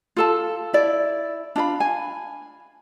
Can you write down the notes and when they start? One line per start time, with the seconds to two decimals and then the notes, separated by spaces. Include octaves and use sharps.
0.17 F4 A4 A5
0.73 E4 D5
1.56 D4 F4 D#5 B5
1.80 G#5